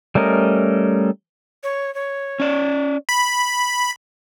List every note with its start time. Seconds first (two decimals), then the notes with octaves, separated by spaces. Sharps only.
0.15 G3 A3 C#4 A#4 D#5
1.63 C#5
1.95 C#5
2.40 C#4 D5
3.09 B5